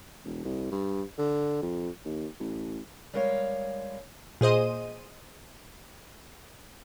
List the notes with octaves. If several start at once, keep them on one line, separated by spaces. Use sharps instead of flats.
E1
C2
G2
D3
F2
D#2
A1
G3 G#3 A#4 C#5 F5
A#2 G#4 C5 D#5 D#7